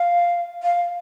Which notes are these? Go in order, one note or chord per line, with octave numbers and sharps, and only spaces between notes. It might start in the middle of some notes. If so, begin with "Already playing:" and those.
Already playing: F5
F5